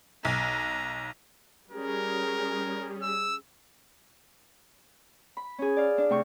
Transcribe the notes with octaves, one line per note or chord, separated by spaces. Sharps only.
B1 A#5
G3 C#4 G#4 A#4
E6
B5
C#4 G#4
D5 F5
D4
C3 A3 G5 C#6